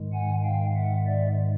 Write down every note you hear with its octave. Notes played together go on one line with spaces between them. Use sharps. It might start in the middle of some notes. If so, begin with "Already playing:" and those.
Already playing: G#2 D#3 G#3
F#5 G#5
F5 G5
E5 F#5
D5 E5